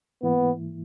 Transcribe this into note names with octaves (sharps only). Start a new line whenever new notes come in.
G#2 E3 A#3 B3 E4